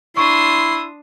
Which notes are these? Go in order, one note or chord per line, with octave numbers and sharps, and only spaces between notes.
D4 E4 C6 C#6 D#6